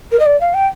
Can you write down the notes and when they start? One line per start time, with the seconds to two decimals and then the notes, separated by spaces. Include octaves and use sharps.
0.11 A#4
0.19 D#5
0.26 D5
0.41 F5
0.54 G5